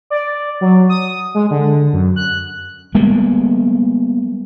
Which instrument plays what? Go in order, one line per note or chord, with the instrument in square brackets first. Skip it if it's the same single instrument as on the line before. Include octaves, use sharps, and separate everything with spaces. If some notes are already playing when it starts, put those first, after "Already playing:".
[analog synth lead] D5
F#3
D#6
G#3
D3
F#2
F#6
[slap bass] G3 G#3 A#3 B3